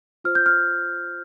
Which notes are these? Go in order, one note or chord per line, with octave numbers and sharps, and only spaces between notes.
F4 C5 F6
G6
F6